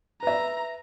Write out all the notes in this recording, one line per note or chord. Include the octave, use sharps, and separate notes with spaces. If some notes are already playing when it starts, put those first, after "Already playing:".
B4 E5 A#5